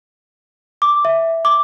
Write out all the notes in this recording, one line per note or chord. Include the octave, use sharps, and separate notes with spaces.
D6
E5
D6